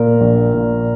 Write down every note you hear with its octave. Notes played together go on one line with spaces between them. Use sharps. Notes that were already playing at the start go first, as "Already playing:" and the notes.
Already playing: A#2 A#4
A#1
A#2